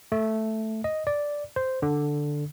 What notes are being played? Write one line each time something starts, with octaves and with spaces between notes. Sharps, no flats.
A3
D#5
D5
C5
D3